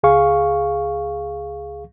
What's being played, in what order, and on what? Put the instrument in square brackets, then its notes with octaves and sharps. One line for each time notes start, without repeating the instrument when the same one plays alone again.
[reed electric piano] C#2 G#4 F5 C#6